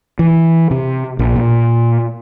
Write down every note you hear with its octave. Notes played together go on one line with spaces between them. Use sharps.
E3
C3
A#1
A#2